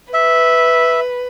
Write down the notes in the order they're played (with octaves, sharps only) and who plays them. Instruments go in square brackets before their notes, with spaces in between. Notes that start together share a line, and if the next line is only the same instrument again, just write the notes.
[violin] B4 [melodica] E5